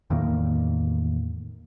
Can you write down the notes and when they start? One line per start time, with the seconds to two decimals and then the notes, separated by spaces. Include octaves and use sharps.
0.10 E2 A2 D#3 A#3